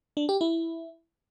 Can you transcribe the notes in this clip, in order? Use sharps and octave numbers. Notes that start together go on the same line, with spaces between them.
D4
G4
E4